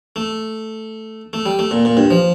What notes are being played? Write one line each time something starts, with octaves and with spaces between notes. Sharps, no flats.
A3
A3
G3
A3
A#2
A#2
G2
F3